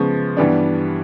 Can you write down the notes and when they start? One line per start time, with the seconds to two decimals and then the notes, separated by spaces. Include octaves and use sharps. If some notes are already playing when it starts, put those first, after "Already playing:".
Already playing: C#3 F3 G#3 B3 C#6
0.37 G2 E3 G3 B3 D4